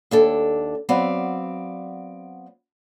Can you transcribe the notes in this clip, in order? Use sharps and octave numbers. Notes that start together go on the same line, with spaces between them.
D#2 D4 A4
F#3 B3 C4 D5 F5